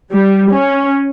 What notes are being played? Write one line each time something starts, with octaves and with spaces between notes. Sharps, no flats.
G3
C#4